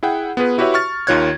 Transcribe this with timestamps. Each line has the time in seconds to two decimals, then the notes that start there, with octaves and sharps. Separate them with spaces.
0.03 E4 G#4 F#5 G5
0.37 B3 F4 G#4 B4
0.58 E4 F#4 G4 B4 C#5 E5
0.74 C#6 F6 A6
1.07 D#2 D#3 F4 C#5 F#6 G#6